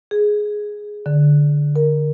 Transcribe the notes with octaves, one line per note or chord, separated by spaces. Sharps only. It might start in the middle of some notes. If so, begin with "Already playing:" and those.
G#4
D3
A#4